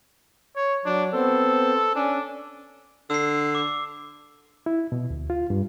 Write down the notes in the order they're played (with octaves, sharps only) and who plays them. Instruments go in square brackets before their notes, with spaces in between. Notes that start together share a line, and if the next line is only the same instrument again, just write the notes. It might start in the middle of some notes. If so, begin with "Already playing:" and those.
[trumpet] C#5
[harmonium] F#3 [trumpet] D4
[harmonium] B3 C4 C5 [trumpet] A4
[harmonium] C#4 G#5 [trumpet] D4
[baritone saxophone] D3 [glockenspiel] E6 C7
[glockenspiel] D6
[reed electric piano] E4
B2
D2
F4
G2